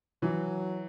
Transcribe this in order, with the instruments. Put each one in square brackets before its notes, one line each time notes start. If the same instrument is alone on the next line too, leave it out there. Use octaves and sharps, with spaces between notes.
[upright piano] E3 [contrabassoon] F#3